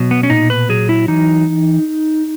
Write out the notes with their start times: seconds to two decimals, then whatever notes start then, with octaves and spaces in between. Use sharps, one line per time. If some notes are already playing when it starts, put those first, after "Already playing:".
Already playing: B2 F#3
0.11 B3
0.23 C#4
0.30 A#2 D#4
0.50 B4
0.69 F#3 G#4
0.89 E4
1.08 E3 D#4